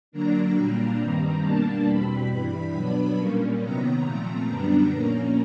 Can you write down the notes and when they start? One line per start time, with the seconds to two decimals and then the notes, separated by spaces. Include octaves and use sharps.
0.12 D3 F#3 A#3 D4 A#5
0.56 A#2 G3 A#3 D4 A#5
0.99 G2 D#3 G3 C4 A#5
1.42 B2 G3 A#3 D4 A5
1.86 E2 B2 G3 C4 B5
2.30 G2 E3 G3
2.73 B2 F#3 B3 D4
3.16 A#2 G3 A#3 C#4
3.60 C3 D#3 F#3 B3 A#5
4.04 A#2 F3 A3 C4 A#5
4.47 F#2 D3 G3 B3 D4 A#5
4.91 A#2 F3 A#3 C#4